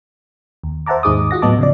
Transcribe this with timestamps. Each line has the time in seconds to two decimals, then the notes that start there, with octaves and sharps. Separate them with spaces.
0.63 D#2
0.86 C5 E5 F#5 A5 A#5 D6
1.03 D#2 G#2 D#4 G#4 D6 D#6
1.31 F4 F#4 F#5 A#6
1.42 A2 F#3 B3 D#5 A5 D6
1.59 C#3 F3 D5